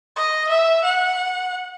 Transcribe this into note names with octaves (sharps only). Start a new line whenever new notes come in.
D#5
E5
F#5